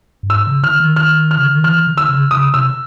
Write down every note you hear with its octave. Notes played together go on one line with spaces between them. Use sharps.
G2
G#2 E6
C#3
D3 F6
D#3
F6
F6
C#3
D3
D#3
E3 F6
D3
E6
C#3
C#3 D#6
C3 E6